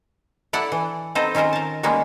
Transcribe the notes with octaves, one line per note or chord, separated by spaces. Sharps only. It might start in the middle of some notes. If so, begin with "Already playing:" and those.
E4 A4 D5 F#5
E3
B3 C4 D#4 A4 C5 D#5
D#3 C#4 F4 A#4 C5
A#4 A5
D#3 G3 G#3 A#3 B3 C#4